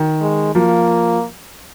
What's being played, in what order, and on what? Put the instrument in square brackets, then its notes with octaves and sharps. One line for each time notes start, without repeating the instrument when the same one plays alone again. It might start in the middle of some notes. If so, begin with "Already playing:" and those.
Already playing: [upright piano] D#3
[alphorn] G#3
[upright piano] F3 [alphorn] A#3